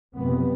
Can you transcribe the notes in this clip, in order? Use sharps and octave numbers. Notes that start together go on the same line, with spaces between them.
F#1 F2 C3 B3